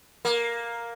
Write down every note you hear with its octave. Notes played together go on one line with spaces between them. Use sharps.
A#3